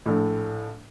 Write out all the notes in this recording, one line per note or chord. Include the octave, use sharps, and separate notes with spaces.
A#1 A2 A3